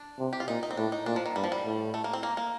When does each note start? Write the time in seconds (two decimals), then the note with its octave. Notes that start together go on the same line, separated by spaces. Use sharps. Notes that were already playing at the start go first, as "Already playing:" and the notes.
Already playing: D4
0.19 C3
0.33 G4
0.40 F4
0.48 A#2 D#4
0.63 D#4
0.71 C4
0.77 A2 D4
0.92 D#4
1.06 A#2 D4
1.16 F3
1.26 D#3
1.36 G2 G3
1.44 F3
1.52 G3
1.65 A2
1.94 A3
2.04 A#3
2.13 C4
2.23 A#3
2.37 A#3